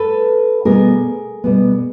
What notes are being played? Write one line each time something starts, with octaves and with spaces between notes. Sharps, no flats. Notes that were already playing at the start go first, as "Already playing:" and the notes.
Already playing: A4 B4
B2 G3 B3 G#4 A#4
B2 G3 B3